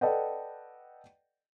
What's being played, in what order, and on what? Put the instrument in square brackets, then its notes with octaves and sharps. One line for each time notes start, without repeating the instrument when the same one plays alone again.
[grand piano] A4 B4 D5 D#5 F#5 G5